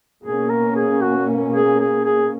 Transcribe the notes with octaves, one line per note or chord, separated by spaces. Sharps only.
B2 A#3 C#4 G#4
A#4
G#4
F#4
G#4
G#4
G#4